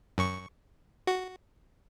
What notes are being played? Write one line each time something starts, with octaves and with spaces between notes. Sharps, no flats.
F#2 C#6
F#4